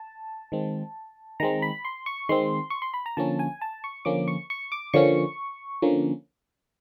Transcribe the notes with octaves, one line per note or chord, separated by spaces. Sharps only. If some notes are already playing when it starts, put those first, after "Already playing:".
Already playing: A5
D#3 G#3 C4
D#3 G#3 C4 A#5
B5
C6
C#6
D#3 G#3 C4 C6
C#6
C6
B5
A#5
D3 F3 A#3 C#4 A5
G#5
A5
C#6
D3 F3 A#3 C#4 D6
C#6
C#6
D6
D3 F3 A#3 C#4 C#6
D3 F3 A#3 C#4